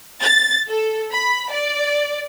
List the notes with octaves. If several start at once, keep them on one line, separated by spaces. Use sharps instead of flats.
A6
A4
B5
D5